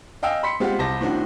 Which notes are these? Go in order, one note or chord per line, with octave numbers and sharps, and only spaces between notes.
D#5 F5 G5 G#5 E6
B5 C6 B6 C#7
G#3 C4 F4 G4 F#5
C2 C5 A5 A#6
A2 D#3 C4 D4 F#4